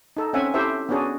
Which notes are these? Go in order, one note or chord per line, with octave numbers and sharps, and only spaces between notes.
D#4 A4
C4 C#4 E5 F#5 G#5
E4 G4 A4 C5 E5
B3 C#4 D4 F#4 G#4